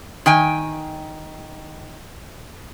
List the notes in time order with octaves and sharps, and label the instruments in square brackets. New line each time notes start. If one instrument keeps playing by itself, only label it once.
[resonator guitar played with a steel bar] D#3 G5 G#5